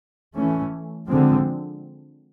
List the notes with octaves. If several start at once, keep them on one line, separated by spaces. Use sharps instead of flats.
E3 A3 C#4
D3 F3 G#3 C4